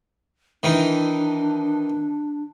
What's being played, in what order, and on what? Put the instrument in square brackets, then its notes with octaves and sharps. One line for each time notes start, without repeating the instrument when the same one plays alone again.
[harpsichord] D#3 E3 D#4 [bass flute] D4